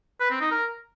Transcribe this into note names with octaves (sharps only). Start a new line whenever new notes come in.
B4
C4
D#4
A#4